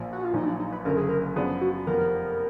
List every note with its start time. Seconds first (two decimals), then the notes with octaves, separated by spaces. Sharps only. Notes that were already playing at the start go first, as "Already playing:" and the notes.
Already playing: A#1 A#2 F3
0.13 F#4
0.24 F4
0.33 A#1 A#2 F#3 D#4
0.46 D4
0.60 D#4
0.72 B4
0.85 F#1 F#2 D3 A#4
0.97 G#4
1.09 A#4
1.36 F#2 F3 B3 D4 G#4
1.61 F#4
1.87 F1 F2 F3 B3 A#4